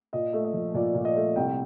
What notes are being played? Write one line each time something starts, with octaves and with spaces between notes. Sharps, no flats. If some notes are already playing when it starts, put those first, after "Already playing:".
A#2 D#5
A3
D#5
F3
A#2 D5
A#2
D#5
A3
C2 G5